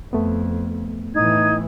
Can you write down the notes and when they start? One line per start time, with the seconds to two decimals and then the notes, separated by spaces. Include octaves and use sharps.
0.13 F2 A3 B3
1.14 A2 E3 D#4 G#6